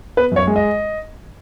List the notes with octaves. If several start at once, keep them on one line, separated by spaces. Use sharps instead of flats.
B3 B4
F#2 C#5
G#3
D#5